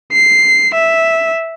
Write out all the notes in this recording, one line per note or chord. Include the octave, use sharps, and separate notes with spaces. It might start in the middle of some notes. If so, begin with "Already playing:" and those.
C7
E5